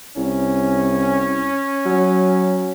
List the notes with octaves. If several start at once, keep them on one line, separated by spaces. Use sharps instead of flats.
C2 C#4
F#3